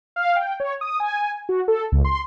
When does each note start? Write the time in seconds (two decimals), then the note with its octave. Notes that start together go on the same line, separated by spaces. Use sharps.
0.16 F5
0.36 G5
0.60 C#5
0.81 D#6
1.00 G#5
1.49 F#4
1.68 A4
1.92 C#2
2.05 C6